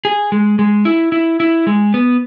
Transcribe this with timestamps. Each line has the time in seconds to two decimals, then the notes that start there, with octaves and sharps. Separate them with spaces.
0.05 G#4
0.32 G#3
0.59 G#3
0.85 E4
1.12 E4
1.40 E4
1.67 G#3
1.94 B3